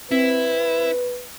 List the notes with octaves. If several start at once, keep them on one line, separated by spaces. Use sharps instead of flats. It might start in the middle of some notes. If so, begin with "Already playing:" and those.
C4 E4 B4